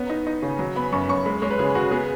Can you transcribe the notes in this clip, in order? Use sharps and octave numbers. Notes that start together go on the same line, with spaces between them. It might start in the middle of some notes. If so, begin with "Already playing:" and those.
Already playing: B3 C#4
D#4
D#4
C#3
F#3
B3 B5
F#2 C#6
F#2 C#6
G#3 B5
G#3 C#5
B4
C#3 G#4
C#3 F#4
B3 G#4